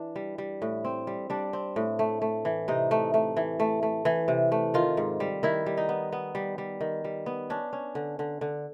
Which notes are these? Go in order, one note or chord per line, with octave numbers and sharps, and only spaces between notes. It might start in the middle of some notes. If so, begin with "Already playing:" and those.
Already playing: E3 D4
G3
G3
A2
C4
G3
G3 D4
C4
A2
A3
A3
E3
C3 D#4
A3
A3
E3
A3
A3
E3
C3
A3
D#3 F4
G#2
G3
D#3 E4
G3
D#4
B3
B3
G3
G3
D#3
G3
B3
C#4 D4
C#4
D3
D3
D3